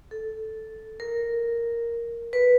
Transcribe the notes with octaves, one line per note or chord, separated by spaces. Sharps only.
A4
A#4
B4